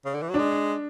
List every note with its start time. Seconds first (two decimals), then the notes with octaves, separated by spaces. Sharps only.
0.05 C#3
0.14 D3
0.22 E3
0.30 F#3
0.34 G#3 D4